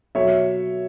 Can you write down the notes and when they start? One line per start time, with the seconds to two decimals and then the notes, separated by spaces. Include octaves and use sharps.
0.15 B2 F#3 C#5 E5